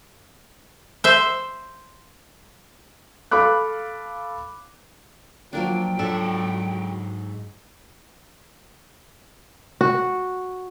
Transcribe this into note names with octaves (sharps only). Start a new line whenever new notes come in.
C5 E5
A4 F5 B5 D6 F#6
F3 F#3 A#3 D4 G5
G#2 F#3 D4 A4 C#5 E5
F#4